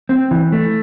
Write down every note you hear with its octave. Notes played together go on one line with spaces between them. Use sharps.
C4
E3
A3